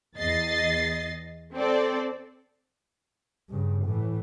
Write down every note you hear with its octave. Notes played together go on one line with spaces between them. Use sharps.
E2 D#5 A6 C7
C4 A4 C5 D5
G2 C#3
A2 E3